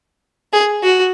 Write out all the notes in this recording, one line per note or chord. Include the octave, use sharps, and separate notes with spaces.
G#4
F#4